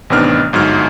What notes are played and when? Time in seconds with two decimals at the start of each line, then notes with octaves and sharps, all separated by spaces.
0.10 A1 C3 D#3 B3 D4 F6
0.53 G1 G#2 F#3 F6